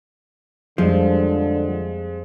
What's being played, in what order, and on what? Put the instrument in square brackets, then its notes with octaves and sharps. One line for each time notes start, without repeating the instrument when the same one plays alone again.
[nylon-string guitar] F2 G3 [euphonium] D3 [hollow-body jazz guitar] F3 [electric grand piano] G#3